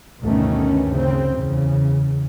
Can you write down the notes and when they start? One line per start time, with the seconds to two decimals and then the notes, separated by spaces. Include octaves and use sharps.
0.22 D2 G2 B2 D#3 A3 C#4
0.92 C#3 C4
1.34 E2 C#3